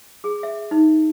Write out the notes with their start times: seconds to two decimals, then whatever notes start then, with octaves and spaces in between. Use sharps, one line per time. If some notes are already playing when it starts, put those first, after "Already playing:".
0.24 G#4
0.43 E5
0.71 D#4